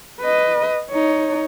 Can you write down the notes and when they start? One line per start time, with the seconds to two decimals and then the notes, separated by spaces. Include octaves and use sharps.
0.21 B4 D#5
0.90 D#4 C#5